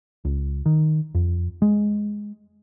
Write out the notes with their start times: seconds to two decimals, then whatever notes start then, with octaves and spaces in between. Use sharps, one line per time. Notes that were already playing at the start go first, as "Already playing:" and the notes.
0.25 C#2
0.66 D#3
1.15 F2
1.62 G#3